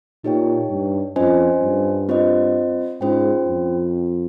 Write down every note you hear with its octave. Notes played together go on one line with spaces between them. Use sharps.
A#2 D#4 G4 C#5 G5
G2
F2 C#4 F4 C5 D#5 G#5
G2
C4 F4 C5 D#5
G#2 C#4 F4 C5 G5
F2